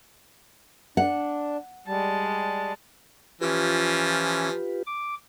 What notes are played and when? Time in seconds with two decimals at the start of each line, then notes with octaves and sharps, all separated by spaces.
0.97 D4 F#5
1.87 G3 G#3 A5
3.41 E3 F3 C#4 F4 G4 B4
4.86 D6